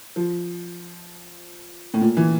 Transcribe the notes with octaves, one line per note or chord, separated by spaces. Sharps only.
F3
A2
A#2
E3